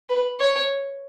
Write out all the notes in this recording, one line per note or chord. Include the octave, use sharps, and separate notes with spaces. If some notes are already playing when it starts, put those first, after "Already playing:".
B4
C#5